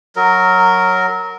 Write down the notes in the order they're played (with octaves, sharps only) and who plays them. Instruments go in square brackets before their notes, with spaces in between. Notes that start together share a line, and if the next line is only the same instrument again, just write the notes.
[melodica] F#3 A#4